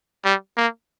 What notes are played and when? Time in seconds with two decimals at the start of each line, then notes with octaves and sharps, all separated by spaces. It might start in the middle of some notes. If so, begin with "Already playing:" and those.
0.25 G3
0.57 A#3